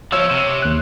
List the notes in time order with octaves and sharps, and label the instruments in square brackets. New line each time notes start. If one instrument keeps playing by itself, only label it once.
[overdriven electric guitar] F3 [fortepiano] C#5 E6
[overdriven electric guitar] C3
[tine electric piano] D#2 F#6